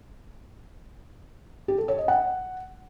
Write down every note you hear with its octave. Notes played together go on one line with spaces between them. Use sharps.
G4
A4
C#5
D#5
F#5